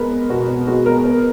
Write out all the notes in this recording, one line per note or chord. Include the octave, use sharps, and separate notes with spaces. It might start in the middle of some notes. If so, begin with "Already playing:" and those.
Already playing: G#3 B3 A#4 B4
B3
B2 F#4
B3
G#3 F#4
B3 A#4
B3